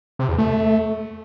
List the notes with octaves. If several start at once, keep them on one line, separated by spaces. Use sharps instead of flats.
C3
E2
A3